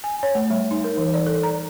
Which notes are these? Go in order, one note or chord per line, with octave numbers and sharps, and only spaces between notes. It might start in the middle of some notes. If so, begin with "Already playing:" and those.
G#5
C#5
A3
G3
D#4
A#4
E3
D5
A4
A#5